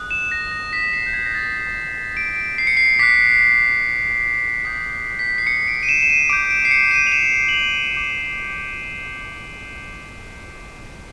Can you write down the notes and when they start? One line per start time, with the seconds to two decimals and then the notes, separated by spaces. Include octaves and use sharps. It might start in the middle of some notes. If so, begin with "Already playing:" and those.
Already playing: D#6 F#6
0.11 E7
0.31 A#6
0.52 A#6
0.73 B6
0.93 C7
1.06 G6
1.13 G#6
1.26 A#6
1.34 D#6 F#6 A6
2.17 D7
2.58 C7
2.67 C#7
2.77 C7
2.99 D6 F#6 B6
4.65 D#6 G6 B6
4.92 B6
5.19 B6
5.38 C7
5.47 C#7
5.68 D7
5.83 D#7
5.89 E7
6.02 E7
6.10 D#7
6.29 D6 G6 D7
6.51 D7
6.65 C7
6.71 C#7
6.91 D#7
7.07 F7
7.12 E7
7.49 F#7
7.54 F7
7.95 D6 G6